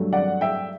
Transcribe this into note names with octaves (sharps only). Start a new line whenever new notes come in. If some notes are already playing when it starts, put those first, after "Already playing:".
Already playing: G2 F#3 A3
D5 F#5
E5 G5